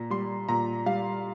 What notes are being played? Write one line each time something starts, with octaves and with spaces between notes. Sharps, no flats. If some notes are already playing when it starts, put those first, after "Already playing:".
Already playing: A#2 A#5
G3 C6
A#2 A#5
G3 F5